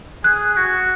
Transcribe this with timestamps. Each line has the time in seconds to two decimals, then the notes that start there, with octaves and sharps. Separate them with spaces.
0.24 G#4 F#6
0.56 F#4